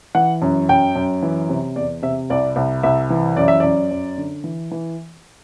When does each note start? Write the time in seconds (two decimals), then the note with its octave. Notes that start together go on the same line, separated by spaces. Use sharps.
0.15 E3 F#5
0.42 F#2
0.69 F#2 G5
0.96 F#2
1.23 E3
1.49 C3
1.76 E2 D5
2.02 C3 E5
2.30 C2 D5
2.56 C2
2.83 C2 E5
3.10 E3
3.37 F#2 D5
3.48 E5
3.60 F#2 D5
3.91 F#2
4.18 D3
4.44 E3
4.71 E3